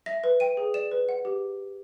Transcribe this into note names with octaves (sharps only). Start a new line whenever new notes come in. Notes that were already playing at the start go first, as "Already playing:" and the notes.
E5 A#6
B4
G5 D#7
G#4
D5 E7
B4
F#5
G4